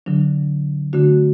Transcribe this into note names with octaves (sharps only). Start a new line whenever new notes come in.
D3 F#3 D4
D3 A3 D4 F#4